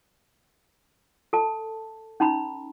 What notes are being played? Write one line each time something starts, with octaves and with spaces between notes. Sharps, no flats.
A4 A5
C#4 D#4 A#5 B5